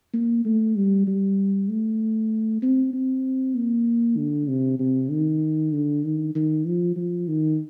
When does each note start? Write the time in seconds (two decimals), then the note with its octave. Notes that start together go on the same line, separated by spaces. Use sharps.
0.13 A#3
0.45 A3
0.76 G3
1.07 G3
1.69 A3
2.62 C4
2.93 C4
3.55 A#3
4.17 D3
4.49 C3
4.79 C3
5.11 D#3
5.73 D3
6.04 D#3
6.35 D#3
6.66 F3
6.96 F3
7.28 D#3